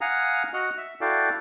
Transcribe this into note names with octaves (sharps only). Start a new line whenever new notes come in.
F5 F#5 G#5 A#5 D#6 F6
F#4 D#5 F#5 F6
E5
E4 F#4 A4 D5 F5 G5